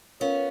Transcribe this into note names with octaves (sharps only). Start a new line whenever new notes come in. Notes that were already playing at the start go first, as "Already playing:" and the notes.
B3 C#4 F4 A#4 C#5 F5